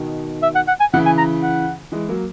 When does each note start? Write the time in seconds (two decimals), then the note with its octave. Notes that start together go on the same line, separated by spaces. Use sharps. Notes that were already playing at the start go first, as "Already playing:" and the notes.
Already playing: B2 D#3
0.43 E5
0.55 F#5
0.68 F#5
0.80 G#5
0.93 C#3 E3 F#5
1.06 G#5
1.18 A#5
1.43 F#5
1.92 E3 G#3
2.09 F#3 A#3